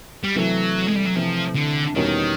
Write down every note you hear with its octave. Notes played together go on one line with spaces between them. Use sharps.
G3
C3 E3 F#3 A3
G#3
G3
F#3
C3 E3 F3 A3
D3
E2 B2 D#3 G3 A#3 C#4